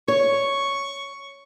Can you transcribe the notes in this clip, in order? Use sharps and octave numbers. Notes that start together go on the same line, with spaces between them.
C#5 C#6